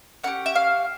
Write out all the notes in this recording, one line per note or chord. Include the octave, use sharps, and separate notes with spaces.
C#4 E4 G4 F#5
E5
F5